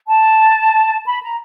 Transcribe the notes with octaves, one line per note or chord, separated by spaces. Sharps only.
A5
B5
A#5